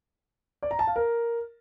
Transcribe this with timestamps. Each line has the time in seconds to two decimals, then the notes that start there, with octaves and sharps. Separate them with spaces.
0.63 D5
0.71 A#5
0.79 A5
0.87 F5
0.96 A#4